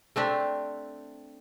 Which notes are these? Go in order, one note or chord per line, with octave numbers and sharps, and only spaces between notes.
A3 C4 D4 G4